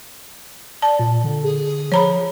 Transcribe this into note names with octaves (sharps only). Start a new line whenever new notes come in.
D5 A5
A#2
D3
G#4
F3 C#5 A#5 B5